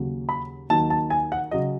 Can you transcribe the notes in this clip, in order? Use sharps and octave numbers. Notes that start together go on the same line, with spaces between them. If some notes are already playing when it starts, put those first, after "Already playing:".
Already playing: D#2 C#3 F#3
B5
D#2 D#3 F#3 A5
A5
G#5
F#5
C#3 F#3 D#5